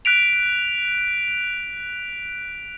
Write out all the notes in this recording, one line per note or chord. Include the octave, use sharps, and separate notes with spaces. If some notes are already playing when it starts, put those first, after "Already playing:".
F#6 B6 D7 F7